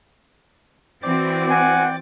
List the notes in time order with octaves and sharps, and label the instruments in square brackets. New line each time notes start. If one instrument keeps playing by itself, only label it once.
[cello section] E3 C4 F#4 [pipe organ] D5 G5 D6
[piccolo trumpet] F#5 [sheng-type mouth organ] G#5